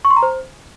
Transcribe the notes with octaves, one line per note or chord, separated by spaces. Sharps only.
C#6
C6
A#5
C5